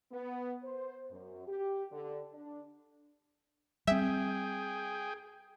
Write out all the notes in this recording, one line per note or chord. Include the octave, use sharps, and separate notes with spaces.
B3
C5
F#2
G4
D3
D4
G3 C4 G#4 E5 G5